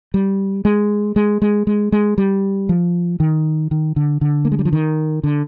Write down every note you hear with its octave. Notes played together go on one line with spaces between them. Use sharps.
G3
G#3
G#3
G#3
G#3
G#3
G3
F3
D#3
D#3
D3
D3
A#3
G#3
G3
F3
D#3
D3